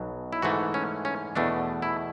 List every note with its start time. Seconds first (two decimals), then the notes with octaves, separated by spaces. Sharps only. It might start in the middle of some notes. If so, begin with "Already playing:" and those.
Already playing: B1 B2 F#3
0.33 E4
0.42 G#2 E3 A3 F#4
0.74 C#4
1.05 C#4
1.35 E2 B2 A3 D4
1.82 E4